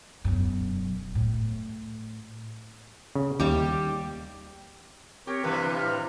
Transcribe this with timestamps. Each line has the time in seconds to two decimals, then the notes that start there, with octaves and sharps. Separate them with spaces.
0.25 E1 F#2
1.15 A2
3.15 C#3
3.40 D#2 G3 G4
5.27 C4 G4 A#4 C#5
5.43 G2 C3 E3 B4
5.78 A2 F6